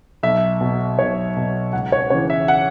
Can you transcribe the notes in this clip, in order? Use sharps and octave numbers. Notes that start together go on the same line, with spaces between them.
B1 E5
B2
B1 C#5
B2
C#2 F#5
C#5
C#3 E3 C#5
E5
F#5